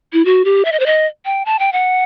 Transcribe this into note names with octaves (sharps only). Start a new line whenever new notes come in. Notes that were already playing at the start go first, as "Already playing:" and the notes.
E4
F#4
G4
E5
D#5
C5
D#5
G5
A5
G5
F#5